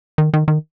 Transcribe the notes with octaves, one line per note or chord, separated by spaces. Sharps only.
D#3
D#3
D#3